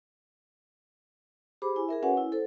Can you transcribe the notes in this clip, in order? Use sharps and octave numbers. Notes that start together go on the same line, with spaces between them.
G4 G#4 C5 B5 D6
E4 G#5
G#4 A#4 E5
C#4 F#4 B4 C#5 F#5 G#5
E4
A4 C5